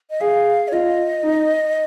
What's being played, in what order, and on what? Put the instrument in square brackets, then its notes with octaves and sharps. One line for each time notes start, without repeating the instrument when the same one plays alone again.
[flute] D#5
[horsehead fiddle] G#4 [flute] F5
[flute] C#5
[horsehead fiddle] F4 [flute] D#5
[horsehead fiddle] D#4